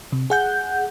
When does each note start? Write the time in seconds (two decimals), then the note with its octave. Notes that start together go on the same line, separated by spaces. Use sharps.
0.12 C3
0.30 G#4 F#5 G6